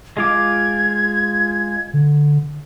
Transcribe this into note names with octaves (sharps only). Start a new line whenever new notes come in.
G#3 F4 D6 G#6
D3